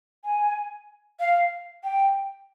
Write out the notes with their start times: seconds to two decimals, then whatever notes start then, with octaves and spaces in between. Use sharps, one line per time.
0.24 G#5
1.20 F5
1.84 G5